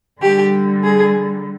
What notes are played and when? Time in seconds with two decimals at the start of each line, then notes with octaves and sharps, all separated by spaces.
0.21 D3 G3 G4
0.82 G#4